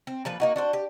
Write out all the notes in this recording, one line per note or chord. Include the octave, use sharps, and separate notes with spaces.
C4
A#2 F3 B4
A#3 D#4 F#4
D4 F#4 C5
G4